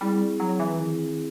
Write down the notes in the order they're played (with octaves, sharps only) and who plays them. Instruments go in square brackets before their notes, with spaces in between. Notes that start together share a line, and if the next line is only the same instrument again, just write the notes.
[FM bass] G3 [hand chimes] C4 E4 G#4
[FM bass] F#3
E3
[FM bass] D#3 [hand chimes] C4 E4 G#4